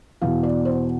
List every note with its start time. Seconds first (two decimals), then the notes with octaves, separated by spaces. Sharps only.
0.21 E2 B2 F5
0.43 D5
0.65 C5